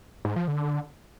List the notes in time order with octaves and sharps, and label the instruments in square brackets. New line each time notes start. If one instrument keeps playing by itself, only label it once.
[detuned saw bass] G#2
F3
D3